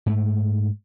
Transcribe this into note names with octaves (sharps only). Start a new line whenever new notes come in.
G#2 A3